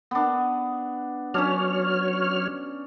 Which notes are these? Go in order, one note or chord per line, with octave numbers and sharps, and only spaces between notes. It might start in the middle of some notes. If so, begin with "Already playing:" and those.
B3 D4
F#3 C#4 D4 C#5 F6